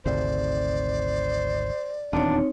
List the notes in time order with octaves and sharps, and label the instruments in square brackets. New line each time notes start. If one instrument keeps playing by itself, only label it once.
[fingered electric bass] G#1 D2 C3 [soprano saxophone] C5 [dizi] D5
[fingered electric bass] D#1 E2 [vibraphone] C4 D#4 C#5 [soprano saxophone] D4